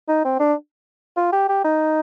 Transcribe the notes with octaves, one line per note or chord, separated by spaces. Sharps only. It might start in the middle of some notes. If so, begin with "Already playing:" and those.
D#4
C4
D4
F4
G4
G4
D#4